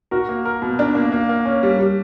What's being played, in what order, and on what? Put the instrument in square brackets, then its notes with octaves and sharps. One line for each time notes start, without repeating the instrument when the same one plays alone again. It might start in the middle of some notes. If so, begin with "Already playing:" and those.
[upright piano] F#4 [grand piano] A#4
[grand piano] A#3
A#4
B2
[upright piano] D4 [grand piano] A#4
[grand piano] A#3
A#3
A#3
C#4
G3
G3